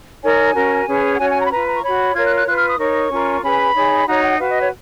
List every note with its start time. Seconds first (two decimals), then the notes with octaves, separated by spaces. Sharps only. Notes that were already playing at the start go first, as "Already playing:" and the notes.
0.23 D#4 A#4 C#5 G#5
0.54 C#4 F#4 A#4
0.87 C#4 G#4 B4
1.13 F#5
1.19 C#4 F#4 C#5 G#5
1.29 G#5
1.40 A#5
1.46 B5
1.51 F4 B4 A#5
1.67 A#5
1.76 C#6
1.82 F#4 C#5 B5
2.14 F4 A#4 C#5 G#6
2.25 F#6
2.36 F#6
2.47 F4 B4 F#6
2.57 F6
2.68 D#6
2.78 D#4 A#4 C#5 C#6
3.11 C#4 F4 A#4
3.42 C#4 G#4 B4 B5
3.74 D#4 G#4 C#5
4.06 D#4 F#4 C#5 A#5
4.23 F#5
4.39 F#4 B4 F5
4.49 D#5
4.60 C#5